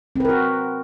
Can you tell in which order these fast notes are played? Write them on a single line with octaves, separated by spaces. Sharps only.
C4 B4 A#4 F#4